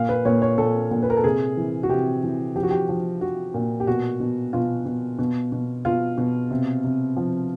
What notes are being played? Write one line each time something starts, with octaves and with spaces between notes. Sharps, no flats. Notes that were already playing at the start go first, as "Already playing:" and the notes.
Already playing: A#2 F5
B4
A#2 C#5
C#5
A#2 A4
A#2
B4
A#4
A4
C3 G#4
E3
F#4
C3 G4
E3
F3 G4
F#4
G4
F3
F3 F#4
A#2
G4
B2 F#4
B2
B2 F4
B2
B2
B2
B2 F4
B2
C3
C3
F3